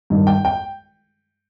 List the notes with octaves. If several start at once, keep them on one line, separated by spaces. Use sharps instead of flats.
G2 D#3
G5
G5